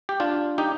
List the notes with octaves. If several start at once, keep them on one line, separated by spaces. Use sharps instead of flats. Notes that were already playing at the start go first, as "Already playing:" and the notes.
G4
D4 F4
D#4 G4